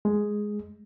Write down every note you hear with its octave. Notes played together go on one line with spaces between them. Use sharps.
G#3